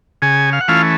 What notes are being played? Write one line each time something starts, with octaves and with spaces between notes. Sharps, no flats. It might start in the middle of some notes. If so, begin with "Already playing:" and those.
C#3 G#4 G#5
F5
F#5
E3 A3 C#4 F4 F5